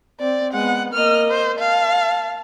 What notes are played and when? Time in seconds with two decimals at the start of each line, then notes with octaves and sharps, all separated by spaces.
0.20 C4 D5
0.53 G#3 B3 F#5
0.93 A#3 D#5 F6
1.30 C5
1.59 F5 A5